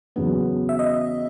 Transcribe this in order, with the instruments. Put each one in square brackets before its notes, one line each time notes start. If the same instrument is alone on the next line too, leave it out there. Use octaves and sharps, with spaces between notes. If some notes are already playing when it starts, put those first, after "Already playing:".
[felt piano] E2 C#3 F#3 B3
[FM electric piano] E5
D#5